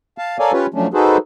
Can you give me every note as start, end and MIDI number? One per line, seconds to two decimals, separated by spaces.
0.18 0.37 77
0.18 0.37 81
0.39 0.52 69
0.39 0.52 70
0.39 0.52 73
0.39 0.52 74
0.39 0.52 77
0.39 0.52 80
0.53 0.66 61
0.53 0.66 65
0.53 0.66 67
0.53 0.66 71
0.53 0.66 73
0.74 0.87 53
0.74 0.87 54
0.74 0.87 57
0.74 0.87 61
0.74 0.87 62
0.94 1.17 63
0.94 1.17 66
0.94 1.17 68
0.94 1.17 69
0.94 1.17 71
0.94 1.17 72